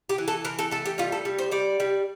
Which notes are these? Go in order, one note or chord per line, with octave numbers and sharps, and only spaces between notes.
G4
E3
A4
E3 A#4
A4
A3 A4
G4
G3 F4
A4
G3
C5
G3 D5
G3